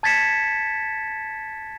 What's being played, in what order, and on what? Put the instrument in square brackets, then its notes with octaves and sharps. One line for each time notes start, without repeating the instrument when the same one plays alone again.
[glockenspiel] A5 G#6 A6 B6 C#7 E7